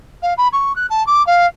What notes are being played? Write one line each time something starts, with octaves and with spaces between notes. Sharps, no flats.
F5
B5
C#6
F#6
A5
D6
F5